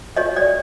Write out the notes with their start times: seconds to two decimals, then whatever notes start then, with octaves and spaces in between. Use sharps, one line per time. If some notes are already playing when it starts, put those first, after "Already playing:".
0.16 F#4 C#5 D#5
0.36 D5